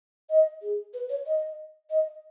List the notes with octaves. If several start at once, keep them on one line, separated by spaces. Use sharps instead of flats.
D#5
G#4
B4
C#5
D#5
D#5